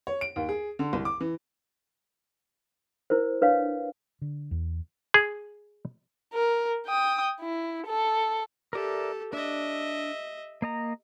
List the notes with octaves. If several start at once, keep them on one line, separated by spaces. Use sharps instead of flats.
C#5
D7
D#2
G#4
D3
C2
D6
E3
E4 A#4 C5
D4 B4 C#5 F5
D3
E2
G#4
A#4
G5 D#6
E4
A4
G4 A4 A#4 D5 E5
D4 D#5 E5
A#3 D#5 A#5